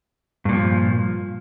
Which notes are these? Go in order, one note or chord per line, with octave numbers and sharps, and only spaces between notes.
G2 A#2 F3